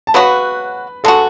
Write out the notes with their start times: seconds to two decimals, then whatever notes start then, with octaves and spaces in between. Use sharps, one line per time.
0.07 A5
0.14 C#3 F#3 B3 F#4 B4 B5
1.04 G#3 B3 F#4 A4 A5